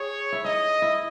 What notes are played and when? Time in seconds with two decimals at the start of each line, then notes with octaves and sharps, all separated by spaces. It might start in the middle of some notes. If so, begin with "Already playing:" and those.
Already playing: G#4 C#5
0.32 E4
0.44 D#4 D#5
0.82 E4